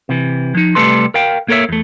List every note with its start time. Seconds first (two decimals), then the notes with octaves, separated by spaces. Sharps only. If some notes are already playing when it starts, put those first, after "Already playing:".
0.09 C3 E3
0.55 F3 D#4
0.75 C2 G3 A3 A4 B4 C6
1.14 A#4 F5 G5
1.48 A#3 A4 A#4 C#5 E5
1.69 E2 A3